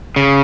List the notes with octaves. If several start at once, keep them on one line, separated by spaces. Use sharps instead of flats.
C#3